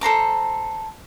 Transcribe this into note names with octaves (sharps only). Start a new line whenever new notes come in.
A4 C5 A#5 D6